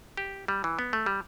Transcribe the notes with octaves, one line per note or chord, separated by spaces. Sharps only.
G4
G3
E3
B3
A3
G3